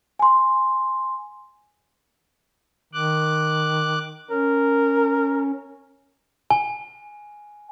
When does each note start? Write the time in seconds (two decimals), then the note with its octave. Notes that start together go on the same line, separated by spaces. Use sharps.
0.19 G#5 C6
2.93 D#3 D6 F#6
4.31 C#4 A#4
6.50 G#5